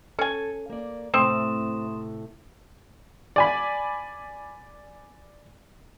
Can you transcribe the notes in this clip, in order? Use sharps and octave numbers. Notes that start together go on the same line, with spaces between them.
C#4 A4 G#5
A#3 D5
A2 C3 A3 C4 C6 D#6 E7
D5 G#5 B5